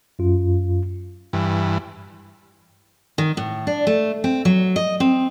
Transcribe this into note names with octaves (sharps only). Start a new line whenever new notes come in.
F#2 F4
G2 E3
D#3
A2
D4
A3
C4
F#3
D#5
C4